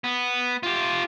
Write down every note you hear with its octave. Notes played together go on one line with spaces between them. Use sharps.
B3
F4 G4